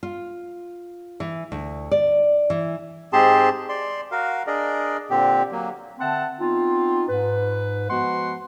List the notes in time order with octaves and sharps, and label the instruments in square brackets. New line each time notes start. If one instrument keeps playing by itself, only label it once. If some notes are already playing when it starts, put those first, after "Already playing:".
[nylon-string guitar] F4
E3
D2
D5
E3
[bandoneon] G#2 C4 G4 G#4 A5 C6
D5 C6
F#4 A#4 F5
D4 G#4 A#4 D5 D#5
A#2 D3 C4 G4
F#3 A#3
[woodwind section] D3 C4 E5 F#5 A5
B3 C4 D#4 F4
G#2 B4
F3 G#3 B3 F#4 F#5 C6